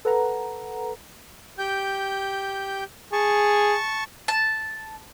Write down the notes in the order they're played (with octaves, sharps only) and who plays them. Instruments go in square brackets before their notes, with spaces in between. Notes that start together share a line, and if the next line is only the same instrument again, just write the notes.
[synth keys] A4 B4 F#5 A#5
[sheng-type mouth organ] G4 G5 G6
[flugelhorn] G#4 [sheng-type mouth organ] A5 C#6
[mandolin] A5